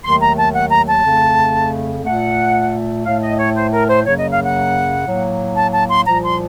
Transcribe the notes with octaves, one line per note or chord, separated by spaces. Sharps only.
D#2 D#3 F#3 A3 C6
A#5
A5
F#5
A#5
A5
F2 C#3 A3
A#2 A3 F#5
A2 A3 F5
D#5
C#5
C5
A#4
C5
F#2 C#3 F#3 A#3 C#5
D#5
F5
F#5
A2 F#3 A#3
A5
A5
C6
C2 A#2 F3 A#5
C6